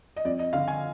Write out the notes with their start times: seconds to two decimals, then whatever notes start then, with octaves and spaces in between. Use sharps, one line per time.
0.16 D#5
0.25 F2 D5
0.39 D#5
0.53 D3 F5
0.68 G#5